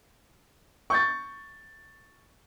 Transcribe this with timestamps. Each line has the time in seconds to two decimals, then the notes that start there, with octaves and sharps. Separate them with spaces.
0.90 C#6 G6 A6